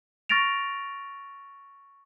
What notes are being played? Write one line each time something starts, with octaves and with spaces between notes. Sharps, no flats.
C#6 F6 A6 A#6 D7 F7